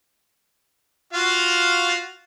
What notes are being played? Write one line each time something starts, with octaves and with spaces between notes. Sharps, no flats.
F4 F#4 F5